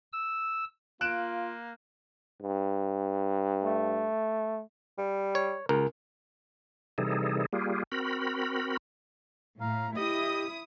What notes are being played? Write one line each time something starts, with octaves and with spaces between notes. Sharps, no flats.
E6
A#3 F4 F#6 D7 E7
G2
A3
G3
C#5
C#2 A#4
C3 E3 G3 D#4 G#4 A4
G3 A#3 F4 G4 G#4
C4 F#4 A#4 B5
A2 F5 A#5
E4 G4 D#5 D#6